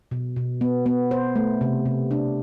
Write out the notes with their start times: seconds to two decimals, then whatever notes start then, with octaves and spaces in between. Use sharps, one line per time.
0.11 B2
0.36 B2
0.61 B3
0.86 B3
1.11 C5
1.36 A3
1.61 C3
1.86 C3
2.11 D4